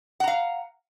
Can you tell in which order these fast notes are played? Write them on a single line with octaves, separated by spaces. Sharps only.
F#5 A#5 F5